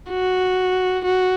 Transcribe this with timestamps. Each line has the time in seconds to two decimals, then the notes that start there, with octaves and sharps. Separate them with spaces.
0.11 F#4
1.05 F#4